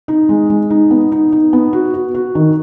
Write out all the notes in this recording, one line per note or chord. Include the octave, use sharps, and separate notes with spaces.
D#4
G#3
G#3
D#4
B3
D#4
D#4
B3
F#4
F#4
F#4
D#3